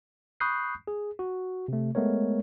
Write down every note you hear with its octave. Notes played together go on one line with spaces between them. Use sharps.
B5 C#6 D#6 F#6 G6 C7
G#4
F#4
C3 A3
G#3 A3 B3 A#4 C#5